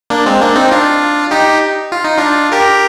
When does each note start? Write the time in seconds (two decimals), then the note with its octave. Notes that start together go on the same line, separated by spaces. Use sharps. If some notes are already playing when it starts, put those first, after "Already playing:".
0.10 A#3 D4
0.26 G#3 C4
0.41 A#3 D4
0.56 C4 D#4
0.71 D4 F4
1.31 D#4 G4
1.92 F4
2.05 D#4
2.17 D4 F4
2.52 G4 A#4